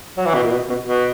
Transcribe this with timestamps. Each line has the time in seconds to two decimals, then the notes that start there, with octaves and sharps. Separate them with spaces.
0.17 F#3
0.26 E3
0.34 B2
0.43 A#2
0.51 B2
0.69 B2
0.86 B2